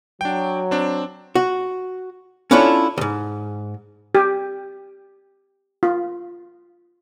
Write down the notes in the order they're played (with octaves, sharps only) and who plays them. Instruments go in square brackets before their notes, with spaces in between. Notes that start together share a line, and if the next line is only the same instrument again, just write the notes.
[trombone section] F#3 [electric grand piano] D4 G5
[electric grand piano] C4 D4
[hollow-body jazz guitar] F#4
C#4 D4 E4 F4 A4 C#5
D2 G#2
[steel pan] G4
F4